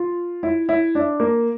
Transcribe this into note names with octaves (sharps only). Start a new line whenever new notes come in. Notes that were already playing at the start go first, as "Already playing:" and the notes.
Already playing: F4
E4
E4
D4
A#3